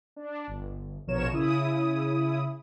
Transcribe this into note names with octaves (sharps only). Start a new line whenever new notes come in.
D4
G1
A#1 B2 F3 A#4 C#5 E7
C#3 E4 D#6